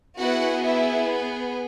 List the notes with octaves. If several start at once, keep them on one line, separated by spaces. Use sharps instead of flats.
B3 E4 F#4 G#4 F#5
E4 E5
B4